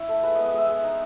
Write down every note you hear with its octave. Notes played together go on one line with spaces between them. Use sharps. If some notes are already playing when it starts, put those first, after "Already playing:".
Already playing: E4 C#5
A3
G#3 B4
B3 D#5
D#5
G#3 E5
G#3
D#4